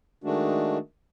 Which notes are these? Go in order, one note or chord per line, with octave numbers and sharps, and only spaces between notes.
D#3 G#3 A3 D4 F#4